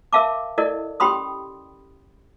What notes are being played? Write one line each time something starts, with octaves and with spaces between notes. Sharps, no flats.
A#4 E5 F5 A5 D6
E4 A4 A#4 D5 D#5
C#4 G4 G5 B5 C6 D#6